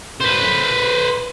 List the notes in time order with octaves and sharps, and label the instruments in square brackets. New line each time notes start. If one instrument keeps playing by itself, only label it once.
[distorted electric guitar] B4 C5